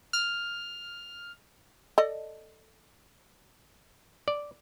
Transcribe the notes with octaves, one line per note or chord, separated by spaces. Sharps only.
F6
A4 D5 D#5
D5